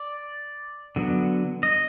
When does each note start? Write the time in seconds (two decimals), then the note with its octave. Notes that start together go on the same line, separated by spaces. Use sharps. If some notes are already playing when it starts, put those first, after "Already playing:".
Already playing: D5
0.96 D3 F#3 B3
1.63 D#5